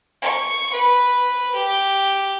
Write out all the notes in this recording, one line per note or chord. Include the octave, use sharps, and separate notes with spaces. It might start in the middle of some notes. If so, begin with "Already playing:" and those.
C#6
B4
G4